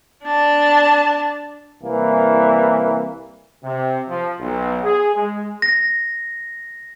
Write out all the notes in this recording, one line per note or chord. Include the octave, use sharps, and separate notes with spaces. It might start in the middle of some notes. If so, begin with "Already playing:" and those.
D4 A5
C2 E3 A#3
C3
F3
B1
G#4
G#3
A#6